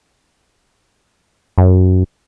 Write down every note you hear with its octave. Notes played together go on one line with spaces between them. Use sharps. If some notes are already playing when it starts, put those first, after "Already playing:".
F#2